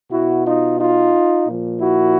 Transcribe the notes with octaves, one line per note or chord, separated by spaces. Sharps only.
B2 E4 F#4
D#4 F4
D#4 F4
A#2 F3
E4 F#4